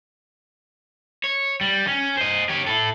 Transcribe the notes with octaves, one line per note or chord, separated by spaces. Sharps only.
C#5
G3
C#4
C5 D#5
G4 C#5
E4 A4